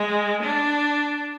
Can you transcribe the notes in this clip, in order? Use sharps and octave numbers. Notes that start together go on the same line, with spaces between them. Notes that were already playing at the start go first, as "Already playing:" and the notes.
Already playing: G#3
D4